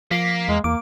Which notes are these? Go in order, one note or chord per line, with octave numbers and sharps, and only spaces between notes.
F3 A#3 B6 C7
E2 G#3
E2 A#3 D6